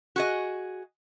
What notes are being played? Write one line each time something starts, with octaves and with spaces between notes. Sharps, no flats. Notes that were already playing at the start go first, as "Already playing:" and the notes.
F#4 G#4 D#5